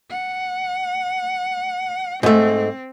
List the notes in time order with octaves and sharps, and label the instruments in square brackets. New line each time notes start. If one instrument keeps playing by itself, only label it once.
[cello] F#5
[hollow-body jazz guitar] G#2 A3 [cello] C4